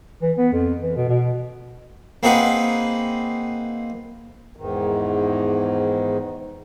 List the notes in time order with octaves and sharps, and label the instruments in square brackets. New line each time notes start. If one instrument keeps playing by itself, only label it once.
[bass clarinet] E3
B3
F2
E3
B2
B2
[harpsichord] A#3 C4 D#4 G#4 B4 F#5
[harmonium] E2 G#2 D#3